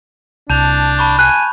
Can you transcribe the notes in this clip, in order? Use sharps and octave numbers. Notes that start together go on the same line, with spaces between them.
C2 D4 A5 G6 F7
A5 B5 C#6
G#5 F#6